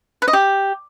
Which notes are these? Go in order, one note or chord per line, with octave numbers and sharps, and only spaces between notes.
B4
D#5
G4